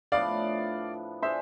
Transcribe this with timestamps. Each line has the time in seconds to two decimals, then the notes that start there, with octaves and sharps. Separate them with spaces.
0.12 A2 F3 B3 D4 D5 F5
1.22 D4 G#4 C5 E5